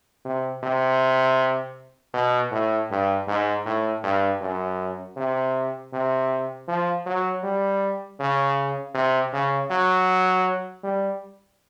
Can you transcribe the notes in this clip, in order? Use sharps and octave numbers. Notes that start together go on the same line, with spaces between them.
C3
C3
B2
A2
G2
G#2
A2
G2
F#2
C3
C3
F3
F#3
G3
C#3
C3
C#3
F#3
G3